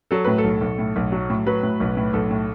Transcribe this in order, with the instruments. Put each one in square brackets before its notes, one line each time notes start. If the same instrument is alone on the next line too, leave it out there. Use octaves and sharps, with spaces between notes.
[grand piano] F#3 A4
A2 B4
A4
B1
B1
A2
B1
F#3
A2
F#3 B4
A2
B1
A2
B1 A4
A2